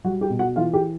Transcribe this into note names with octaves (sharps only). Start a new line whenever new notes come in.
G3 F#4 F#5
G4 G5
B2
F#4 F#5
E3 F4 F5
G4 G5